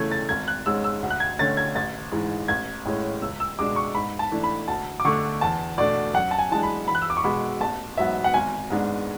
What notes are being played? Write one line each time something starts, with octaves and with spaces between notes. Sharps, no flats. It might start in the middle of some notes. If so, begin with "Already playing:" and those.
Already playing: C#2 C#3 E3 A3 C#4 G#6
A6
G#1 G#6
F#6
G#2 G#3 C#4 E6
E6
D2
F#6
G#6
D3 A3 C#4 A6
G#6
A1 A6
G#2 E3 G#3
A1 G#6
A2 G#3 C#4
C#2 E6
E6
B2 G#3 D4 D6
C#6
G#2 B5
A5
E3 A3 D4
B5
D2 A5
D6
D3 A3 D4 C#6
E2 A5
B2 A3 D4 D5
F#2 F#5
A5
G#5
E3 G#3 D4 A5
B5
E2 B5
F#6
E6
D6
C#6
B2 G#3 B3 B5
A1 A5
G#2 F#3 B3 E5
F#5
G#1 G#5
G#2 G#3 B3 D4